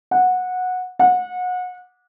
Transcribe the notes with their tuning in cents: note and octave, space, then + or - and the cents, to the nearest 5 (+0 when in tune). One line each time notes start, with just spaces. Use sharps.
F#5 -15
F#5 -30